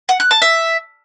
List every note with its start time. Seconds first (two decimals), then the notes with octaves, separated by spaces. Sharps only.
0.09 F#5
0.20 F#6
0.31 A5
0.42 E5